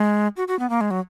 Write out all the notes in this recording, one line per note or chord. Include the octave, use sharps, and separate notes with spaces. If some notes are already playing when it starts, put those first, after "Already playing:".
Already playing: G#3
F#4
F#4
B3
A#3
G#3
F#3